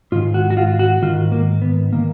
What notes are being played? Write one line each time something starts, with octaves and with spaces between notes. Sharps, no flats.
G#2 D#3 F4
F#4
F#4
F4
F#4
G#2 D#3 F4
A#3
B3
D#3 A#3